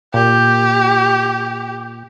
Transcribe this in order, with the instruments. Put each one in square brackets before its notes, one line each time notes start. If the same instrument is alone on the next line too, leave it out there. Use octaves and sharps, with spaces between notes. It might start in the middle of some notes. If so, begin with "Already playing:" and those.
[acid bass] A#2 [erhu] G4